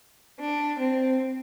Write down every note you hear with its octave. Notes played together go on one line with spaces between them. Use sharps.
D4
C4